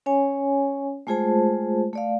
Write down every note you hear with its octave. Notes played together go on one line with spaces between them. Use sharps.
C#4 C#5 G#5
G#3 A3 F4 G#4 C5 A5
A3 D5 F5